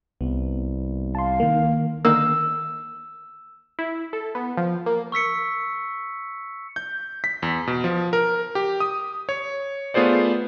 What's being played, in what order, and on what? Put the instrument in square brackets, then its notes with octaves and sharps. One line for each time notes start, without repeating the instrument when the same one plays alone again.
[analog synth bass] C2 [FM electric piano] B3
[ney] F5 [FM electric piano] A5 C6
[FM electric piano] D#3 A#3
[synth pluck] D3 D#3 A#3 [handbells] E6
[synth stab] E4
A4
B3
F3
A#3
[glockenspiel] C#6 E6 B6 C#7
[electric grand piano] G6
B6
E2
B2
F3
A#4
G4
D#6
C#5
A3 B3 F4 G#4 C5 D5